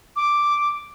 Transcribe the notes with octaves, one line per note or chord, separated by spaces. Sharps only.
D6